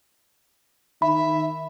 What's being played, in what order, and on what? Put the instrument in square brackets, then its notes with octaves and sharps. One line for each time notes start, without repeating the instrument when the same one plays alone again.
[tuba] D#3 [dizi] E5 [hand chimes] B5